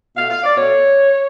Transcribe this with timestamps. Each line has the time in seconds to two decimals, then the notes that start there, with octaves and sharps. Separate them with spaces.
0.16 B2 A3 F5
0.30 F5
0.44 D5
0.57 B2 A3 C#5